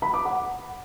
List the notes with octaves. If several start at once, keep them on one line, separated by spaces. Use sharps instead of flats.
B5
D6
F#5